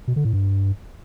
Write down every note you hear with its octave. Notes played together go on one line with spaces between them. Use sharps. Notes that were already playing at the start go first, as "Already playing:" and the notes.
B2
D3
A2
G2